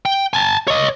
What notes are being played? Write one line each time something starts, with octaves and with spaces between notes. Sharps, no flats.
G5
G#5 A5
C#5 D#5